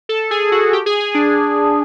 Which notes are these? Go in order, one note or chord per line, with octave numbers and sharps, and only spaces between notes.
A4
G#4
F#4
G4
G#4
G#4
D4